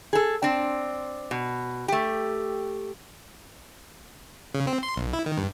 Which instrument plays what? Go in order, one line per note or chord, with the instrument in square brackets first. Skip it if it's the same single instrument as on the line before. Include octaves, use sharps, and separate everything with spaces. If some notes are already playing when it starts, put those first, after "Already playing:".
[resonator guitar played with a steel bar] G#4 A4
C4 D4
B2
A3 G4
[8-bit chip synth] C#3
C4
C6
B1
E4
D#3
G2